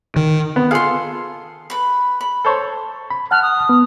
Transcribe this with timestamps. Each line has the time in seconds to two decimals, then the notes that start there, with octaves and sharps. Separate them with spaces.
0.16 D#3
0.56 B3
0.71 F4 G#4 A4 F5 C6
1.70 B4 B5
2.21 B5
2.45 A4 C5 C#5
3.10 B5
3.31 F#5 A5 F6 F#6
3.43 D#6
3.69 B3